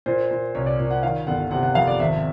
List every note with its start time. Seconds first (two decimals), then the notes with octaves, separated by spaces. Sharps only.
0.06 A#2 C5
0.31 A#2
0.55 C2 C#5
0.66 D5
0.80 A#2
0.90 F#5
1.03 D#3 F5
1.27 G1 F#5
1.51 C3 F#5
1.63 F#5
1.75 F2 F5
1.87 D5
1.99 G#1 E5